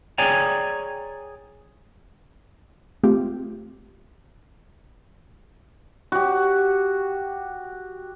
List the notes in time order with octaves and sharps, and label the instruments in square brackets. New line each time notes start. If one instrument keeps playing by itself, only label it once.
[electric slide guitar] G#4 C#5 D5 G5 G#5 A#5
[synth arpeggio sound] A3 C4 F4 G4
[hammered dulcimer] F#4 G4